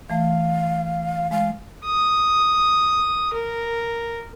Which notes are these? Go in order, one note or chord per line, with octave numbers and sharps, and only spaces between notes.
E3 A3 F5
G#3 F5
D#6
A#4